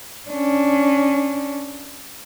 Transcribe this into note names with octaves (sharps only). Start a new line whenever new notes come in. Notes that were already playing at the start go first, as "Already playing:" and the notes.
C#4 D4